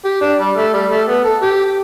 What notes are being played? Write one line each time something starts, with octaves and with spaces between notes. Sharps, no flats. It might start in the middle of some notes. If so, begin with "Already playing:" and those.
G4
D4
G3
A3
G3
A3
B3
A4
G4